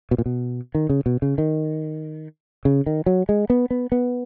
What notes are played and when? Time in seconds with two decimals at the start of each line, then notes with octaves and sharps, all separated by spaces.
0.11 B2
0.18 A#2
0.26 B2
0.75 D#3
0.90 C#3
1.06 B2
1.22 C#3
1.38 D#3
2.65 C#3
2.86 D#3
3.06 F#3
3.29 G#3
3.50 B3
3.71 B3
3.92 B3